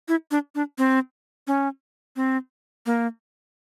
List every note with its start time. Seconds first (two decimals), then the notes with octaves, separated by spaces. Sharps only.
0.08 E4
0.31 D4
0.55 D4
0.78 C4
1.47 C#4
2.16 C4
2.86 A#3